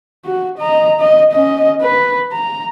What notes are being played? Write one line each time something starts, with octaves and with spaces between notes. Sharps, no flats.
F#4
D#5 A#5
D#5
C#4 D#5
B4
A#5